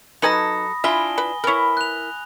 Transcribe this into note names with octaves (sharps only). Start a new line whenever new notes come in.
F#3 D#4 A4 B4 G#5 B5 D#6 A#6
D4 E4 F4 E5 G#5 G7
B4
E4 A#4 B4 C#5
F#6 F7